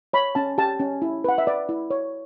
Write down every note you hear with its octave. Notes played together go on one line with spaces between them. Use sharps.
C#5 B5
C#4 A5
G4 A5
C#4
E4
B4 F#5
E5
B4 D5
E4
C#5